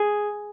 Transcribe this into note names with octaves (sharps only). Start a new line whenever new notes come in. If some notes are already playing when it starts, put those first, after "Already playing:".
Already playing: G#4